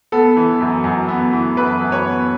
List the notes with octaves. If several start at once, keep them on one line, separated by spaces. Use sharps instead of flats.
B3 A4
E3
F#2
F#2
B3
E3
F#2 B4
F#2
C#5
B3